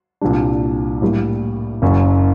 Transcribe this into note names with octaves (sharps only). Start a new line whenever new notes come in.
C2 A#2 G3 D4
A2 G3 A#3
F#1 F#2 F#3